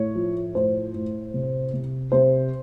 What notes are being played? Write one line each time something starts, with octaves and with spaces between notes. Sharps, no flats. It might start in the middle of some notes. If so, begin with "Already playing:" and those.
Already playing: A2 C#5
F3
A2 C5
A2
C3
C3
C3 C5